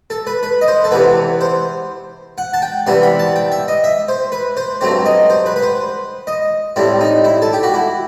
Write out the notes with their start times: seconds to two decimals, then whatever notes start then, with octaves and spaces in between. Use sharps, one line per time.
0.10 A4
0.27 B4
0.43 B4
0.61 D#5
0.68 C5
0.84 A4
0.91 E2 C3 E3 B3 B4
1.41 C5
2.38 F#5
2.54 A5
2.62 G5
2.87 C3 E3 G3 B3 C6
3.03 B5
3.19 A5
3.36 G5
3.52 E5
3.68 D#5
3.84 E5
4.08 C5
4.32 B4
4.57 C5
4.81 G2 F#3 A3 C4 C5
5.06 D#5
5.30 C5
5.46 B4
5.56 B4
5.62 C5
6.27 D#5
6.76 A2 G3 C4 E4
7.01 D#4
7.24 E4
7.42 A4
7.53 G4
7.63 F#4
7.74 E4